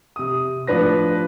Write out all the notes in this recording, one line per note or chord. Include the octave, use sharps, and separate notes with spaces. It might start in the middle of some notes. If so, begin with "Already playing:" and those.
C3 D#6
A2 F3 D4 B4 A#6